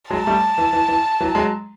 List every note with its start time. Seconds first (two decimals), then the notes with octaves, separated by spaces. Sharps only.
0.10 F#3 G#3 A5
0.27 G3 A3
0.58 E3
0.73 E3
0.88 E3
1.20 E3 F#3
1.35 F#3 G#3